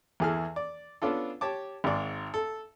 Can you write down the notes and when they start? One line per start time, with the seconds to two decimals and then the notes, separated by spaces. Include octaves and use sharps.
0.20 E2 E3 G#4 A4 F6
0.56 D5
1.02 B3 C#4 D4 F4 A4
1.41 G4 C#5 A5 D6
1.84 G#1 G#2 D5
2.34 A4